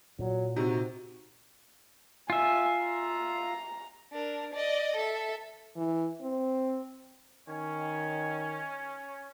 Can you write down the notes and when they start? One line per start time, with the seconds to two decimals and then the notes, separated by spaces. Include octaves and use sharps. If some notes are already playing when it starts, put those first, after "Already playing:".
0.19 A#2 F#3
0.56 C3 C4 D#4 F#4
2.30 F4 E5 G#5
2.84 A#5
4.12 D4 A#4
4.53 D5 D#5
4.96 A4 E5
5.76 E3
6.21 C4
7.49 D#3 C#4